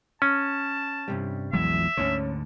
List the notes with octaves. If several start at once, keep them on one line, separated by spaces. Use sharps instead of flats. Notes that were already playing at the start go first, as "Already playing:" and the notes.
C#4 A5
G2 C3 G3
A#1 E2 F#3 G#3 E5
D2 G#2 D3 C#4 C#5